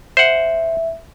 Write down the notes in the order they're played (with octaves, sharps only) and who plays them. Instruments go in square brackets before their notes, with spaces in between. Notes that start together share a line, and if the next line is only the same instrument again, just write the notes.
[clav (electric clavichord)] C5 F#5 [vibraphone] E5